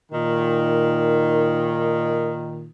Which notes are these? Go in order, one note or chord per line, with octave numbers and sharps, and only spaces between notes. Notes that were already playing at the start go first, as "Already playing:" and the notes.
A#2 D#3